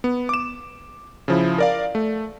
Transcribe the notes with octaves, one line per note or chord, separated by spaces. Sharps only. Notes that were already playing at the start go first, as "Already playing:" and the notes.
B3
D6 E7
C#3 F3 E4
A#4 D5 F5
A3